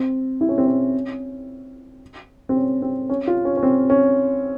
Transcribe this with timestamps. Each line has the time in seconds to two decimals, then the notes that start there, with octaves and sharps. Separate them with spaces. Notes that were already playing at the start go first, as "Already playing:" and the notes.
Already playing: C4
0.41 E4
0.49 C#4
0.58 C4
0.67 C#4
2.49 C4
2.56 C#4
2.82 C4
3.10 C#4
3.27 F4
3.45 C#4
3.57 C#4
3.63 C4
3.90 C#4